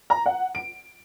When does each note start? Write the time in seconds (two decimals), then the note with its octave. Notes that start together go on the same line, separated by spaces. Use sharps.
0.10 A#5
0.26 F#5
0.55 D7